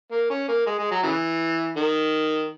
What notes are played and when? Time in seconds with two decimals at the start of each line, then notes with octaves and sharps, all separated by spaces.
0.11 A#3
0.30 C#4
0.48 A#3
0.66 G#3
0.79 G#3
0.91 F#3
1.03 C#3 E3
1.77 D#3